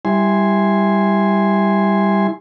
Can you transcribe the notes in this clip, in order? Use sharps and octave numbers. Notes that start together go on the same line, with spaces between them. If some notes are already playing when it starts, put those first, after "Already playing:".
G3 E4 G#5 C6